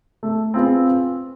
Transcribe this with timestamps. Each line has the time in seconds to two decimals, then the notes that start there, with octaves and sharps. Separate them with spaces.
0.23 A3
0.54 C4 F4 G#4 B4